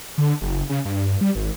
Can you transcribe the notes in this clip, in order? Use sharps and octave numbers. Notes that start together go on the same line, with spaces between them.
D3
F#1
C#3
G2
G3
G#1